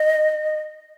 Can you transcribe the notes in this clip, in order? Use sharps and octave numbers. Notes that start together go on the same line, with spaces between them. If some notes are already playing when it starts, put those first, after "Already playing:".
Already playing: D#5